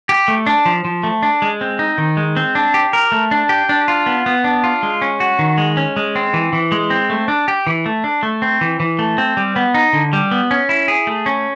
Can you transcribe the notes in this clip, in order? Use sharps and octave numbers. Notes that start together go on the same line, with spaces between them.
G4
A3
D4
F3
F3
A3
D4
G#3
C4
D#4
D#3
G#3
C4
D4
G4
A#4
A3
D4
G4
D4
F4
B3
B3
D4
F4
G#3
C#4
F#4
D#3
G#3
C#4
G#3
C4
E3
E3
G#3
C4
A3
D4
G4
E3
A3
D4
A3
C4
E3
E3
A3
C4
G3
B3
D#4
D3
G3
B3
C#4
E4
G#4
A3
C#4